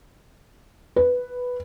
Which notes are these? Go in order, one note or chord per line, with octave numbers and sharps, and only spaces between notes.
B4